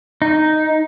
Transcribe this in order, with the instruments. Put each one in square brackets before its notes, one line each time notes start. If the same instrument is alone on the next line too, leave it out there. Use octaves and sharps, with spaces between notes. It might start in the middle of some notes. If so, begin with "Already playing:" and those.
[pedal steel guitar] D#4